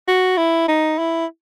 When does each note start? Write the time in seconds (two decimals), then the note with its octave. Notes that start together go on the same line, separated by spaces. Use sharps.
0.08 F#4
0.37 E4
0.68 D#4
0.98 E4